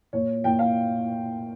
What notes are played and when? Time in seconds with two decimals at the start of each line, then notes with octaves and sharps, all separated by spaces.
0.13 A#2 C#5
0.44 A#2 G5
0.59 F5